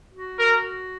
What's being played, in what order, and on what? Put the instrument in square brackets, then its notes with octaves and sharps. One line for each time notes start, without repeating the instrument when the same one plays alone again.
[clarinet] F#4
[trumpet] A#4